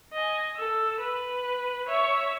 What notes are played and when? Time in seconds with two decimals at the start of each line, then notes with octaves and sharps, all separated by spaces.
0.13 D#5 G#5
0.57 A4 E6
1.00 B4
1.88 C#5 E5